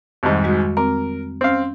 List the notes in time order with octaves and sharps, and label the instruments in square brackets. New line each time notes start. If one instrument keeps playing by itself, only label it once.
[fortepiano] C2 G#2 [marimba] F2 D#3 G3
[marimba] G#3 F#4 D#6
[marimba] C4 D6 [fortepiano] A#4
[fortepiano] C4 F5 [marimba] C#4